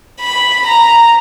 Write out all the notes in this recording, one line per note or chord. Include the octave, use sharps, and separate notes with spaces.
B5
A#5